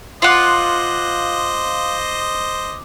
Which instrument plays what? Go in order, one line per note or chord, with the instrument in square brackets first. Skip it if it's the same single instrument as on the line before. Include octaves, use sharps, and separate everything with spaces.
[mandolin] F4 F#5 [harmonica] C5 D#5 [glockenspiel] D6 F#7